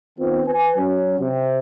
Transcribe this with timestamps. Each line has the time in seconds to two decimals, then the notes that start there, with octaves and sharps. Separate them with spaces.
0.18 D#3 B3 C4 F4
0.47 B4 G#5
0.76 F#3 C#4
1.20 C3